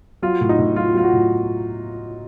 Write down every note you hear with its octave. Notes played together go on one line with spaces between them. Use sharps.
F#3 F4
A2
D#4
A2
F#3 F4
F#3 F4
F#4
A2